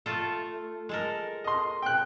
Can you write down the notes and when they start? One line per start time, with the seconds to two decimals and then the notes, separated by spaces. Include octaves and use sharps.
0.06 A3 F4 A4
0.89 G#3 A4 A#4
1.44 D#5 C6
1.82 G5 F#6